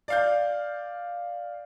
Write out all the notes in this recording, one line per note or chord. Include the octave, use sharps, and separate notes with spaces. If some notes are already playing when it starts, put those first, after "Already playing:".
D5 F5 G6